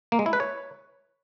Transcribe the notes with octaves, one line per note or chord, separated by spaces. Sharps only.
A#3
G#3
E4
B4
C#5